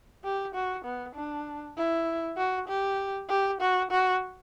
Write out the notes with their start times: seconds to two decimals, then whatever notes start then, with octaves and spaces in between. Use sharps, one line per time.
0.24 G4
0.55 F#4
0.85 B3
1.15 D4
1.77 E4
2.37 F#4
2.68 G4
3.29 G4
3.61 F#4
3.91 F#4